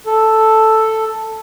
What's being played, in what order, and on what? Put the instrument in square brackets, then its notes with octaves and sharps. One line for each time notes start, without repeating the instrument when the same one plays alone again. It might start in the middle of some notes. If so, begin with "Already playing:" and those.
[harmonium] A4